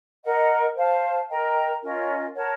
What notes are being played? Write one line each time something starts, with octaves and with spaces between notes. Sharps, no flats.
A#4 D#5 F#5
C5 F5 A5
A#4 D#5 G5 A#5
C#4 F4 A#4 D#5
A#4 C#5 F#5 A5